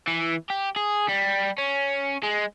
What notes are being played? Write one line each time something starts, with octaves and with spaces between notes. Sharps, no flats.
E3
G4
G#4
G3
C#4
G#3